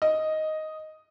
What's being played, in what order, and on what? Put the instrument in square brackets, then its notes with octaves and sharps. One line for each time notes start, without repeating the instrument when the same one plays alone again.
[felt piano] D#5